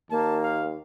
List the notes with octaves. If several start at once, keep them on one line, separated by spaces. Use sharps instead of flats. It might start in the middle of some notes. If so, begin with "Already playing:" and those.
D#2 A#3 A5
F5